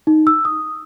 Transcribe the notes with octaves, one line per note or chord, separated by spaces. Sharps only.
D#4
E6
D#6